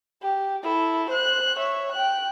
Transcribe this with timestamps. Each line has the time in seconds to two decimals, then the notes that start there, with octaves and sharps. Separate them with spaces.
0.22 G4
0.63 E4 A4
1.10 C5 F#6
1.57 C#5 E5
1.92 G5 F#6